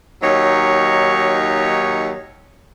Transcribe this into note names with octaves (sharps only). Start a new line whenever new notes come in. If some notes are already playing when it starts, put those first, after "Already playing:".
D#2 F#3 D#4 C#5